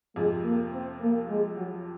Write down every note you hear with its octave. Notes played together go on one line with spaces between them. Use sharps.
F2 C3 F3 G#3
A#3
C4
A#3
G#3
F#3